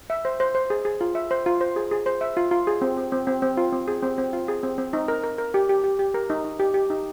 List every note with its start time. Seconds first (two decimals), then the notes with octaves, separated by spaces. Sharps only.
0.10 E5
0.25 C5
0.40 C5
0.55 C5
0.70 G#4
0.85 G#4
1.01 F4
1.15 E5
1.31 C5
1.46 F4
1.61 C5
1.76 G#4
1.91 G#4
2.06 C5
2.21 E5
2.37 F4
2.51 F4
2.67 G#4
2.81 C4
2.97 C4
3.12 C4
3.27 C4
3.42 C4
3.57 F4
3.73 C4
3.88 G#4
4.03 C4
4.18 C4
4.33 F4
4.48 G#4
4.63 C4
4.78 C4
4.93 D#4
5.08 A#4
5.24 A#4
5.38 A#4
5.54 G4
5.69 G4
5.84 G4
5.99 G4
6.14 A#4
6.30 D#4
6.44 D#4
6.59 G4
6.74 G4
6.90 D#4